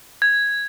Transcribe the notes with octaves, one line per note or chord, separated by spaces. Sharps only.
G#6